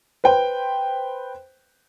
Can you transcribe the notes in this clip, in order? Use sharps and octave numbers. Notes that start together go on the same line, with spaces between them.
B4 C5 G5